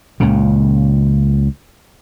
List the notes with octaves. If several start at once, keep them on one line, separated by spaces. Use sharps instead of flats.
C#2 A#2 C#3